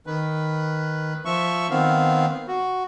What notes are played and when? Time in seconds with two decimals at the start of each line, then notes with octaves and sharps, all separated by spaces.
0.07 D#3 B4
1.25 F3 E5 C#6
1.71 D#3 B3 C4 F5
2.48 F#4